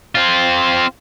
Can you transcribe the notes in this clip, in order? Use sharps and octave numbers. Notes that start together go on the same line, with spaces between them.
C4 F4